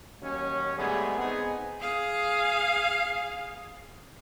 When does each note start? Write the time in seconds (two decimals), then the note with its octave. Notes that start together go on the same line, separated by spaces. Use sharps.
0.22 D#2 F#3 C#4
0.77 G#2 G3 A3 B3 G#4
1.18 B3 C4 D#4 G#4
1.80 G#4 F5